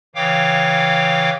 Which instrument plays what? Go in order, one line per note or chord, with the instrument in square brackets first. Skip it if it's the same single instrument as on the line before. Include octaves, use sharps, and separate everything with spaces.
[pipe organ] C#3 E3 C#5 F5 G5 D6